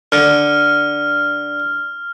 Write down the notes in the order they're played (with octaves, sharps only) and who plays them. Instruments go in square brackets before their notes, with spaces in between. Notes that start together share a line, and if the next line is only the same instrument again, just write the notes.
[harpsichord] D3 [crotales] F6